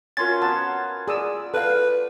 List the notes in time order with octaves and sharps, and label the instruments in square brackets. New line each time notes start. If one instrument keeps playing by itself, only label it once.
[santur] C#4 F4 F#4 [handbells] A#4 C6 A6
[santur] B3 [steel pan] A5
[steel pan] G#4 D#6 E6 [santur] D5
[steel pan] A4 F5 [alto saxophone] B4